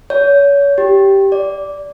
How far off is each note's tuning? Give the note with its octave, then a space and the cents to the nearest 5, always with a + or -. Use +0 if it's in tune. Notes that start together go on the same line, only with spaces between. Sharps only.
C#5 +30
G4 -5
D5 -10